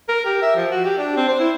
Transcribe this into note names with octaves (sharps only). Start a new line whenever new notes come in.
A#4
G4
E5
F3
F#4
G4
D4
C4
C5
E4